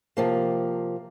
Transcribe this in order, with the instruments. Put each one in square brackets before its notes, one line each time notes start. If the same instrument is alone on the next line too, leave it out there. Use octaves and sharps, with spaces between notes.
[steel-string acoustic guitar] C3 F3 A#3